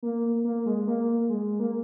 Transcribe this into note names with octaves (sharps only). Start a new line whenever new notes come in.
A#3
A#3
G#3
A#3
G#3
A#3